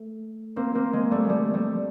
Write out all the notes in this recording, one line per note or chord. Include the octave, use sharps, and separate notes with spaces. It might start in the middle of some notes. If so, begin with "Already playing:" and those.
Already playing: A3
A#3 C4
A#3 C4
G#3 A#3
G3 A3
G#3
G3 A3
G3 A3